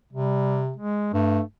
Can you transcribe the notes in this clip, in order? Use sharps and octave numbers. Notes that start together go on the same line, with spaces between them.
C3 G3
G#3
G2 A3